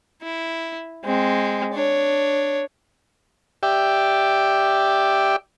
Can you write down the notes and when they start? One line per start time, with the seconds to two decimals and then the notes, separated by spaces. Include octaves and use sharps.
0.22 E4
1.04 G#3 C4
1.73 D4 C#5
3.63 G4 D5 E5 G5